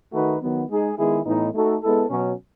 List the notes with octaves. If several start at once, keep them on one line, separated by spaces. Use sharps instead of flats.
D#3 A3 D#4 F#4 B4
D#3 F#3 B3
G#3 D#4 G#4
D#3 G#3 B3 E4 G#4
A2 E3 B3 D#4
A3 D#4 F#4 A4
G#3 B3 E4 A4
B2 F#3 C#4